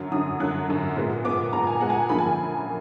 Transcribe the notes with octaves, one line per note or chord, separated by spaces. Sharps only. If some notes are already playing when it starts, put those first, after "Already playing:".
Already playing: F#2 D3 F#3
F#2 D3 F#3 D#6
F#2 D3 F#3 F#6
F#2 D3 F#3
A#2 G#3 B3
A#2 G#3 B3 D6
A#2 G#3 B3 A#5
G#5
A#2 G#3 B3 F#5
G#5
F#2 D3 F3 A#3 B5
G#5